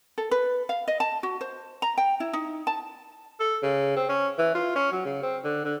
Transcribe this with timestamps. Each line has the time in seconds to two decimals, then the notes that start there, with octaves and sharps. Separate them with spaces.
0.18 A4
0.31 B4
0.69 F5
0.88 D#5
1.00 A5
1.23 F#4
1.41 C5
1.82 A#5
1.98 G5
2.20 E4
2.33 D#4
2.67 A5
3.40 A4
3.63 C#3
3.96 C4
4.09 C#4
4.38 E3
4.55 F4
4.76 C#4
4.92 F#3
5.05 C#3
5.23 C4
5.44 D3
5.65 D3